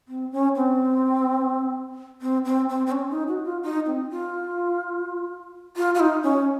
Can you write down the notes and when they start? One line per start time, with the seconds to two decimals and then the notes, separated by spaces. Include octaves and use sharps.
0.08 C4
0.32 C#4
0.56 C4
2.22 C4
2.45 C4
2.69 C4
2.86 C4
2.92 C#4
3.11 D#4
3.28 F#4
3.45 F4
3.63 D#4
3.86 C4
4.10 F4
5.76 F4
5.95 F4
6.00 D#4
6.23 C#4